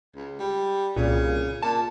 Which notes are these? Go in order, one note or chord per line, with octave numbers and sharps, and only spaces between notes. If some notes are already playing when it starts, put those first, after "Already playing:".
C#2
G3
C2 A#2 C#3
A#2 A5